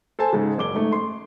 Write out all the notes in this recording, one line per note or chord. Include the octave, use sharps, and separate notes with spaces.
A4 C5 G#5 A5
G#2 C#3
F#1 D6 G7
G#2 A3
C6